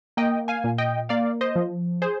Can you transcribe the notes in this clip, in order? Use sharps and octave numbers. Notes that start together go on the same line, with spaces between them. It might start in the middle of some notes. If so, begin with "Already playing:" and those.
A#3 D#5 G5
F5 G#5
A#2
D#5 G5
A#3 D5 F5
C5 D#5
F3
G#4 C5